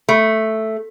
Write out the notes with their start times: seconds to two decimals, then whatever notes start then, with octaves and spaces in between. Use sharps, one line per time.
0.09 A3